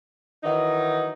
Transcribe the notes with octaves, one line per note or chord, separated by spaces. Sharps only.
D#3 E3 F#3 D#4